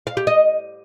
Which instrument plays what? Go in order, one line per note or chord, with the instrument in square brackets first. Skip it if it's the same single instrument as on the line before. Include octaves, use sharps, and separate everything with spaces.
[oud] F5
G4
D#5